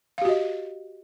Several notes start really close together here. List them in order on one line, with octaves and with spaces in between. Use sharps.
F5 G4 F#4 D#5